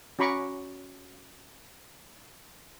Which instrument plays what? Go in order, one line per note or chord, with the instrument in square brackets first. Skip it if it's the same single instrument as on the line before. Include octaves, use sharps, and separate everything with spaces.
[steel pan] C#4 F#4 A#5 B5 C#6 D6